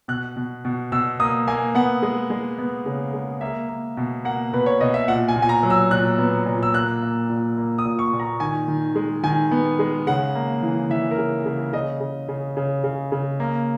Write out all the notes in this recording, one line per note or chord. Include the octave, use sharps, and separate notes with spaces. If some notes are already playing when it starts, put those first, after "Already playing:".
B2 F#6
B2
B2
B2 E6
A#3 D#6
A#3 G#5
B3 F#5
G#3
G#3
B3
C#3
G#3
A#3 E5
A#3
B2
A#3 F#5
B2 B4
C#5
B2 D#5
E5
A#2 F#5
G#5
A#2
G#5
A#5
F#3
E6
A#2 F#6
B3
A#2
E6
A#3 F#6
A#3
A#2
A#3
D#6
A#2
C#6
A#2
A#5
D#3 G#5
D#3
G#3
D#3 G#5
B3
G#3
C#3 F#5
A#3
E3
E3 E5
A#4
C#3
C#3
C#3 D#5
C#3
C#3
C#3
C#3
C#3
A#3